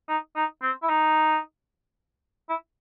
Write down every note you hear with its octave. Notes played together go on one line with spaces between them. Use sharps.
D#4
D#4
C4
E4
D#4
E4